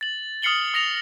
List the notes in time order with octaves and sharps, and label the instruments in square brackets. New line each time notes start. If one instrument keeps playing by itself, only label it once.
[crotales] A6 F#7
D#6 F6 C7 C#7 F#7 G7
D#6 A#6 C#7 F7